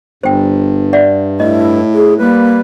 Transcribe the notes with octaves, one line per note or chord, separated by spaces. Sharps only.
G1 G2 C5 G5
D5 E5 F#5
A2 E4 D#5
G#4
G3 A#3 B4